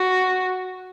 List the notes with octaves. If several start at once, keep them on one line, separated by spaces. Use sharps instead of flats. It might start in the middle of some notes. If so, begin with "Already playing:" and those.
Already playing: F#4